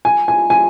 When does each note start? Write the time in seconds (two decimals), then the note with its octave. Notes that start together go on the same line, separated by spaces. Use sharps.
0.05 G#5
0.28 G#5
0.50 G#5